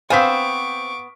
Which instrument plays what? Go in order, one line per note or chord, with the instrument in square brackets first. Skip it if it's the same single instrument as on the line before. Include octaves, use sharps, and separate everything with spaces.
[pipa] B3 [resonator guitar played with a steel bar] C4 C5 G#5 [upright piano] F5 B6 [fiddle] C#6 D6